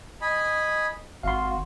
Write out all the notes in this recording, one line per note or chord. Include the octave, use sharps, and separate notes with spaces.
D#5 G#5 B5
G#1 F#4 F5 C6